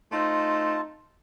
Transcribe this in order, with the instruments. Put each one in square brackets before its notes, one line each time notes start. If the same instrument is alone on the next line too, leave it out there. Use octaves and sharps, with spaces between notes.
[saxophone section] A3 C4 D#4 [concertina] F4 A5